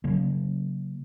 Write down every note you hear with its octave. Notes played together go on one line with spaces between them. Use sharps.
C#3 F#3 A#3